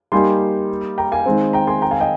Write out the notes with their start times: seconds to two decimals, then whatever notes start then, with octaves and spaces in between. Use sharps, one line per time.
0.12 G3 A#3 D#4 G4 G#5 C6
0.98 G5 A#5
1.12 F5 G#5
1.26 D#3 G#3 C4
1.53 G5 A#5
1.67 G#5 C6
1.82 G5 A#5
1.91 F5 G#5
2.00 D#5 G5